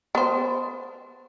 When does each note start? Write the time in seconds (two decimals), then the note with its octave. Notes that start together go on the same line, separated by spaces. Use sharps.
0.15 B3 C5